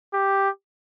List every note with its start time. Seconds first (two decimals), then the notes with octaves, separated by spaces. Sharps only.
0.13 G4